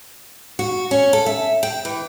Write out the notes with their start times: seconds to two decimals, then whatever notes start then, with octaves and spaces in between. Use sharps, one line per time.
0.59 F#4
0.91 C#4
1.13 A4
1.26 E5
1.63 G5
1.85 E3